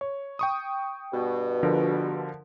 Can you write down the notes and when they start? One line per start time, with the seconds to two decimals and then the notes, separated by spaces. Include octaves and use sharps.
0.01 C#5
0.39 G5 C#6 D#6
1.13 G2 B2
1.63 D3 F3 A#4